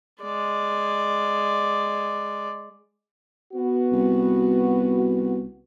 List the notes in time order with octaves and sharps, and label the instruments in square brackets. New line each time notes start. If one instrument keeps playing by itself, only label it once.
[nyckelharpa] G#3 D5
[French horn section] B3 F#4
[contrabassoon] C2